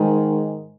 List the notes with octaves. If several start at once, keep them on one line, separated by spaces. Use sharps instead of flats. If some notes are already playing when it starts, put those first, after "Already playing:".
Already playing: G#2 D#3 G#3